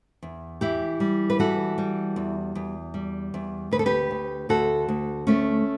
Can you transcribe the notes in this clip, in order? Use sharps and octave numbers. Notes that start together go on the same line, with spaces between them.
E2
E3 E4 G4
G3
B4
E3 F#4 A4
G3
E2
E2
G3
E2
D2 B4
A4
G4 B4
D2
D2 F#4 A4
D2
D2 A3 C#4